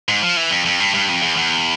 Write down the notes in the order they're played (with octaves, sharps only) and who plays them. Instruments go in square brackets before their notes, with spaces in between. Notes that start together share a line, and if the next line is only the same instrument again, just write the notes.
[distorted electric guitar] G#2
F3
E3
F2
F2
G2
G2
F2
E2
E2